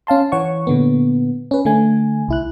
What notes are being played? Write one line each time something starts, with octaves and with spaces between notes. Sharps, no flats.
C#4 F5 A5 C6
E3 C#5 F#5 C#6
A#2 D3 B3
C#4 B4
D3 A3 G#5
C2 E4 F#6